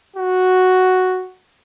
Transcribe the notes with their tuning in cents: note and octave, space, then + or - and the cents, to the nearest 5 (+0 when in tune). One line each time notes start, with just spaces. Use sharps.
F#4 +0